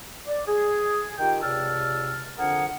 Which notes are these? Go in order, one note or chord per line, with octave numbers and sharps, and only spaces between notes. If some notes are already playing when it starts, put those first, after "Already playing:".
D5
G#4
D#3 F4 G4 G5
C#2 C3 D5 A5 E6 F6
F2 D3 D4 G#4 A#4 F#5